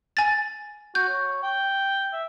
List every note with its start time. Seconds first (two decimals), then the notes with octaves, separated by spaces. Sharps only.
0.17 G#5 A6
0.95 F#4 G6
1.08 C#5
1.43 G5
2.13 E5